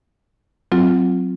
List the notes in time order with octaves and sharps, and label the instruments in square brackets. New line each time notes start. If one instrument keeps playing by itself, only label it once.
[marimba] F#3 C4 F4